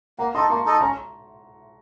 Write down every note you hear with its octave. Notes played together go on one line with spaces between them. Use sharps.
A#3 F#5 A#5
D#4 A4 D#5 A5 C6
A#3 A#5 C#6
D#4 A4 D#5
C#4 A#5 C#6